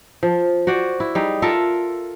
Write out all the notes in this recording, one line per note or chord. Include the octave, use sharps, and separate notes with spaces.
F3
F#4 C5 D5
E4
G3 D#4 G#4
F4 A4 A#4 E5